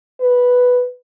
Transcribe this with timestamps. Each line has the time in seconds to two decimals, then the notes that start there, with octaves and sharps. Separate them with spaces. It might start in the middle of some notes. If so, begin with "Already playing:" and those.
0.20 B4